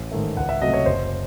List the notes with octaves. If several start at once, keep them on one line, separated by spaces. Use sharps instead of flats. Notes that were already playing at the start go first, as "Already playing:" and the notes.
Already playing: A1
G#2 D#3 A3
C#2 F#5
E5
C3 F#3 A3 D#5
C#5
F#1 C5